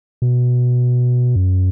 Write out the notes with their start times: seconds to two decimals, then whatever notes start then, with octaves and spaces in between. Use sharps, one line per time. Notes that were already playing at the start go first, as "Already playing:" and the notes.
0.22 B2
1.36 F#2